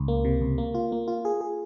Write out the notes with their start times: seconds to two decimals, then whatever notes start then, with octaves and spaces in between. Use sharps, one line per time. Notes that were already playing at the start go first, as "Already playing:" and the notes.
Already playing: C#2
0.08 A#3
0.25 C3
0.41 C#2
0.58 A#3
0.75 F4
0.92 A#3
1.08 F4
1.25 G#4
1.41 G#4